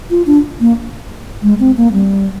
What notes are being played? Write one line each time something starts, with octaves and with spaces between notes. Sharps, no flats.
F4
D4
A#3
G#3
C4
A#3
G3